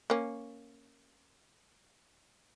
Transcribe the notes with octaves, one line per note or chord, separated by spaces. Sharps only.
A#3 C#4